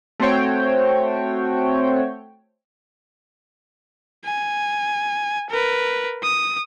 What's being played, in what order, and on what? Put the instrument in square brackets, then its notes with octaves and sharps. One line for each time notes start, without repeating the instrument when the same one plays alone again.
[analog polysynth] A3 C4 F#4 C5 C#5 G5
[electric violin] G#5
A#4 B4
D#6